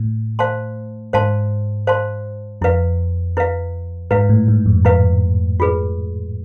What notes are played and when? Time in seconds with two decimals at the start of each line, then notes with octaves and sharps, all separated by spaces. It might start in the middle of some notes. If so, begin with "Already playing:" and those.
Already playing: A2
0.39 C5 F5 A5 C6
1.13 G#2 C5 F5 A5 C6
1.87 C5 F5 A5 C6
2.61 F2 E4 B4 F5
3.37 E4 B4 F5
4.11 G#2 E4 B4 F5
4.29 A2
4.48 G#2
4.66 F2
4.85 F2 E4 B4 F5
5.60 F4 G#4 B4